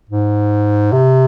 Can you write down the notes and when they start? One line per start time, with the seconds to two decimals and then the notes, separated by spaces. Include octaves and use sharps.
0.09 G#2
0.92 C3